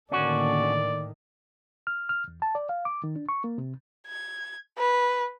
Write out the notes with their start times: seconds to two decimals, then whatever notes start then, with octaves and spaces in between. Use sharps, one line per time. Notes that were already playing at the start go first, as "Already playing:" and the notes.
0.12 A2 D3 D#3 A#3 C#4 F#4 A4 D5
1.87 F6
2.09 F6
2.28 E2
2.42 A5
2.55 D5
2.69 F5
2.85 D6
3.04 D#3
3.16 D4
3.29 C#6
3.44 A#3
3.58 C3
4.07 G#6
4.78 B4